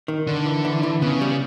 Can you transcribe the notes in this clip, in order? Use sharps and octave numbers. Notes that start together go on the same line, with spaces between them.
D#3
D3 D4
E3
E3
E3
C#3 B3
G3